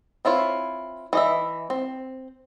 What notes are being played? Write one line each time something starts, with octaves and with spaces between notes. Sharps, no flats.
C4 E4 F4 C#5
E3 D#5 E5
C4